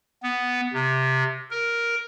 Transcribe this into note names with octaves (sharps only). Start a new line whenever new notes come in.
B3
C3
A#4